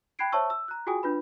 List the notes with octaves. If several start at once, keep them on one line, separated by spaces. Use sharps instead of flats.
G5 B5 F#6 G#6 C7 D7
C5 C#5 E5 A5 C#6 E6
E6
A#5 F#6
F4 F#4 G#4 G5 G#5 D#6
D4 F4 B4 B5